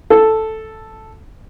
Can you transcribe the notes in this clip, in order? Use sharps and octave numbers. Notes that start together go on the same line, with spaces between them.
A4